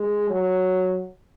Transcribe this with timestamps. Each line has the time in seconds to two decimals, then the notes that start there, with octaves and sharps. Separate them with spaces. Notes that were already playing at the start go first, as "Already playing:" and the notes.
Already playing: G#3
0.30 F#3